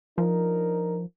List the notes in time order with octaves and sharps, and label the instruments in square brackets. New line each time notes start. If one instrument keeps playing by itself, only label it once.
[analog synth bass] F3 [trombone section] D4 D#4 A#4